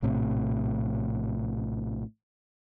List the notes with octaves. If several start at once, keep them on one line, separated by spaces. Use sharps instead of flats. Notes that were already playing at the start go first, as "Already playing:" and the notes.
A#1 A2 C3